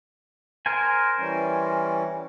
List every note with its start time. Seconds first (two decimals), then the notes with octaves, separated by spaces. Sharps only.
0.66 A#4 C5 G#5
1.18 E3 G3 C#4